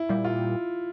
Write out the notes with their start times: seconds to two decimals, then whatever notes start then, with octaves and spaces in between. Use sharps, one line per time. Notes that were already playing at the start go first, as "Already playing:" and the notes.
Already playing: E4
0.09 A#2 G3
0.24 F4